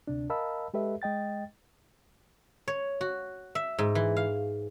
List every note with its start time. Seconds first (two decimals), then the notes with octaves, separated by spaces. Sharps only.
0.07 D2 C3 D4
0.30 A#4 D#5 F5 A5 B5 E6
0.74 G#3 G4 A4 B4 D#5 E5
1.02 G#3 D#5 G5 A6
2.68 C#5
3.01 F#4
3.55 E5
3.79 G#2
3.95 E3
4.16 F5